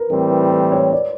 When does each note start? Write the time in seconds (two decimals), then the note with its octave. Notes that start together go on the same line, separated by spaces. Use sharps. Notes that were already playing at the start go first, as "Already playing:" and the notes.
Already playing: A#4 B4
0.10 A2 E3 G3 C4 A#4
0.30 B4
0.51 B4
0.72 C#5
0.92 D5